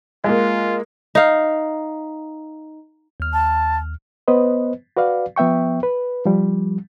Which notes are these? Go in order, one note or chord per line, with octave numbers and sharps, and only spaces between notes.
G#3 A#3 F4
D#4 F5
D#2 F6
A5
B3 B4 C5 D#5
F#4 B4 D5 F5
F3 B3 E5 G5 C#6
B4
F3 G3